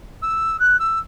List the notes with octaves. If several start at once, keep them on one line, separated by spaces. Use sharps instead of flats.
E6
F#6
E6